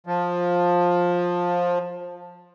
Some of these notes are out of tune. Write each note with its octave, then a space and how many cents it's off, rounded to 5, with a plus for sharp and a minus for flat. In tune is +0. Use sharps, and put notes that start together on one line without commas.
F3 +15